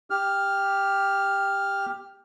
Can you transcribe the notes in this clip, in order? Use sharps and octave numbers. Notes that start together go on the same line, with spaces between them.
G4 F6